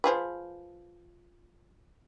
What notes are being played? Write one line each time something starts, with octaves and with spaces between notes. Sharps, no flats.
F3 G#4 B4